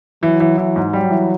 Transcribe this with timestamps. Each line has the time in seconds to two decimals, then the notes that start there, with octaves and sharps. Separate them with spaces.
0.23 E3 F#3
0.40 E3
0.58 E3
0.76 G#2
0.93 F#3 G3
1.10 E3